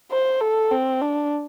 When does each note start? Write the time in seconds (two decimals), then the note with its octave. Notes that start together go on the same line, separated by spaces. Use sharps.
0.11 C5
0.41 A4
0.72 C4
1.01 D4